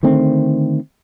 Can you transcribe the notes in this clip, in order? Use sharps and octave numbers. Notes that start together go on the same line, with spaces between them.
D3 D#3 A3 C4